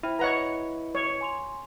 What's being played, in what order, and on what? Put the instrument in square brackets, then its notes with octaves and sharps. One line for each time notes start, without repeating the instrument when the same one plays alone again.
[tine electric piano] E4 [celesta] C5 G5 F6
[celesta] B4 D#5 [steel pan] C#5 F#5 A#5
[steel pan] C#5
[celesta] G#5 C6 F7